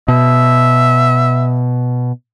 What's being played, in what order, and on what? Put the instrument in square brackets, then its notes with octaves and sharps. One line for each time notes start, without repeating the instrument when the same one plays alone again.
[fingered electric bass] B2 [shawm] E5